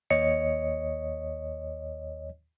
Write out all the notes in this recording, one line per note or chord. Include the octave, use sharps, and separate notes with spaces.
D#2 C#5 D#5 C#7